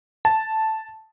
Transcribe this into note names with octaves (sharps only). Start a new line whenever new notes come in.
A5